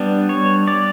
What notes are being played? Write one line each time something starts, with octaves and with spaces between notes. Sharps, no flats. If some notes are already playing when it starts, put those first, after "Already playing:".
Already playing: G3 B3 D4
C#5
D5